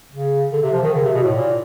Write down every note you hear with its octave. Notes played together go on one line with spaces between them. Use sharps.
C#3
D3
C3
F3
D#3
C#3
C3
B2
A2
A#2